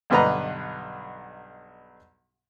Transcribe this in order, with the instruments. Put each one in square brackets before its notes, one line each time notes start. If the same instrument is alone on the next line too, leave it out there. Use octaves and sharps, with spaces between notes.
[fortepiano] B1 G2 D3 B4 D#5 A#5